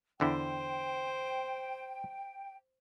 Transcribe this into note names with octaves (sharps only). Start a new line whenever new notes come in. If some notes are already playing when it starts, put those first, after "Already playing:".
E2 D3 E4 C5 G5